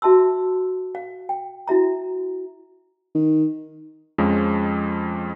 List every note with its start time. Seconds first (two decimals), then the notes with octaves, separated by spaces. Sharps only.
0.02 F#4 E5 A5 C6 E6
0.95 F5
1.29 G5
1.68 E4 F#4 E5 A#5
3.15 D#3
4.18 F2 F3 G#3 C#4